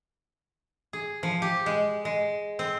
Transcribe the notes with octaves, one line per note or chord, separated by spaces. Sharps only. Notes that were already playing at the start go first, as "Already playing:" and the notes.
G#4
F3
G4
G#3
G#3
C4